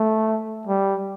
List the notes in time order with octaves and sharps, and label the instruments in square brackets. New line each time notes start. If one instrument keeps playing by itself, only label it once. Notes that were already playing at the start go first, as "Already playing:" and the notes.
Already playing: [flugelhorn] A3
G3